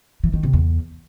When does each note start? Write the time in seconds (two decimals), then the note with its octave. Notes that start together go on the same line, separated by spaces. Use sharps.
0.24 E3
0.33 D#3
0.43 C3
0.53 E2